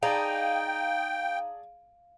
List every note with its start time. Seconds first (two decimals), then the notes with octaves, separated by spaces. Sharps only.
0.03 D#4 G#4 D5 F5 G5 A5